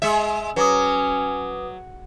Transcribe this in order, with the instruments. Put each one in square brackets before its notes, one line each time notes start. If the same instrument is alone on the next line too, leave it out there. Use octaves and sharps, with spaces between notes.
[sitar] G#3 E5
[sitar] F#3 [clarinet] C#4 [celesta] B4 D6 D#6